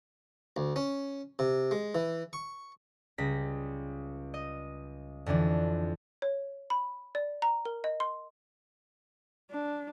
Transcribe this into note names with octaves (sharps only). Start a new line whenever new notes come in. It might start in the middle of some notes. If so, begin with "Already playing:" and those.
D2
C#4
C3
G#3
E3
C#6
C#2 G3 A#6 B6
D#5
F2 D3 E3 D4
C#5
B5
D5
A#5
A#4
D#5
C6
D4